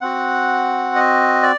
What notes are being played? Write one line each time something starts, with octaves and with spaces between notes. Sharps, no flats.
C4 F#4 F#5
D#5
D5